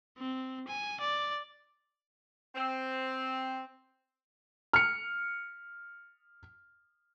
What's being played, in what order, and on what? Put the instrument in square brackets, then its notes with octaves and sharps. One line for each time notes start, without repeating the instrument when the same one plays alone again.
[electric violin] C4
G#5
D5
[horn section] C4
[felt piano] F6 C#7